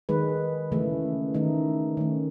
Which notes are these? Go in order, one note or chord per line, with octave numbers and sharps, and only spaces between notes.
D#3 G#3 B4
C#3 E3 A3
D#3 A3 D#4
D#3 A3 C#4